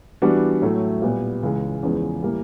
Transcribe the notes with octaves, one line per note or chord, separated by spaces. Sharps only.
E3 G3 B3 D4 F#4
A2 F#3 A3
A#2 G3 B3
C#2 C#3 E3 G#3
E2 C#3 F3 G#3 B3
A2 E3 G3 A#3